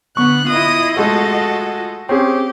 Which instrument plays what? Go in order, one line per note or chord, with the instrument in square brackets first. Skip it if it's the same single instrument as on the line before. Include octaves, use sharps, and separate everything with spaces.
[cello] D3 B3 [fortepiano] C#6 [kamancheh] F#6
[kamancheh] E4 D#6 [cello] F4 D#5
[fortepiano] G#3 A3 [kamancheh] F#4 A4
[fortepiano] C4 C#4 G#4 [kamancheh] G4